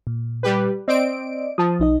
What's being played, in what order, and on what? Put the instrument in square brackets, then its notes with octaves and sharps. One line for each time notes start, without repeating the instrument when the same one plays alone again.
[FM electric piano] A#2
[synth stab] G3 G4 B4
[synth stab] C4 D7 [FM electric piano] D5 D#5
[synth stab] F3 [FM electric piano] A5 D#6
[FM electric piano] B1 D#4 D#5